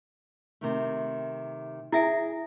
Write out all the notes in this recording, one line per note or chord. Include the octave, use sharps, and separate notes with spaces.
C3 D#3 A3
E4 G#4 E5 G#5